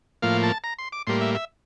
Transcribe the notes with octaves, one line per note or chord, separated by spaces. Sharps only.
A2 F3 A#3 F5
A5
A#5
C6
D6
A2 G3 A#3 C6
E5
E5